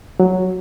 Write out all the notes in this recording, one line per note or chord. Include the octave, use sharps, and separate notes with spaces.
F#3